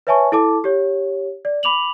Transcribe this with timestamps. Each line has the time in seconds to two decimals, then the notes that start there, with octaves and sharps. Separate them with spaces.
0.07 B4 C#5 E5 G#5 A5 C#6
0.32 E4 A4 A5 D6
0.64 G4 C#5
1.45 D5
1.63 B5 D6 F7 F#7